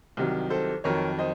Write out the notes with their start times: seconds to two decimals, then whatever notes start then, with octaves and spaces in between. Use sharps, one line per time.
0.17 C2 C3 D#3 F#3
0.50 A4 C5
0.84 F2 D#3 F#3 A#4 C#5
1.18 C5 D#5